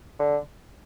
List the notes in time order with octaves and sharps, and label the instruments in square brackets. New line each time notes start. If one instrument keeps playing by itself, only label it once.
[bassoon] D3